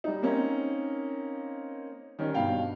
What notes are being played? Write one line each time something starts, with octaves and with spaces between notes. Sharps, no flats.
G3 D#4
A#3 C4 C#4 D#4
D#3 G3 C#4
G2 B2 F5 G5